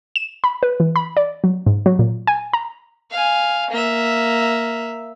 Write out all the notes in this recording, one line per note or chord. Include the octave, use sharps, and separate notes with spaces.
E7
B5
B4
E3
B5
D5
F#3
G#2
F#3
A#2
G#5
A#5
F5 G#5
A#3 E5